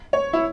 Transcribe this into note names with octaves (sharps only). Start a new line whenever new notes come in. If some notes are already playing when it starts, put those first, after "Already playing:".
C#5
E4